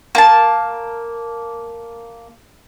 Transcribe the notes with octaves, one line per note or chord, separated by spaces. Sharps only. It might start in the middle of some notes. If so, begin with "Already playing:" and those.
A#3 A5